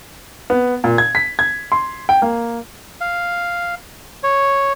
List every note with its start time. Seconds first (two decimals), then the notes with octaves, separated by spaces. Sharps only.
0.50 B3
0.84 A#2
0.98 G#6
1.15 B6
1.39 G#6
1.72 C6
2.09 G5
2.22 A#3
3.01 F5
4.23 C#5